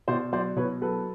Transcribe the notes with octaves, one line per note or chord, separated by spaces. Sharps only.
B2 C5 D5
F#3 C5 D5
B2 B4 C#5
F#3 A4 B4